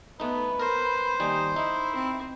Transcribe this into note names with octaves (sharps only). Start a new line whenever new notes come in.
A3 B3 D#4 B4
A#4 C5
D#2 G3 D#4 G#5
D#4 E4
C4